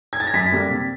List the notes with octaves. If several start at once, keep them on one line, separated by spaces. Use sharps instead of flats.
G#6
A6
A#6
F#2 B6
D3 G3 A#3 D4
C3